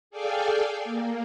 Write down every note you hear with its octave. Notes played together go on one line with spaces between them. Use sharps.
G#4 A4 D5 F5 G5 G#5
A#3